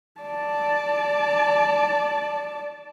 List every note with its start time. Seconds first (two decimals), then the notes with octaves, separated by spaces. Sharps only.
0.21 D5 A5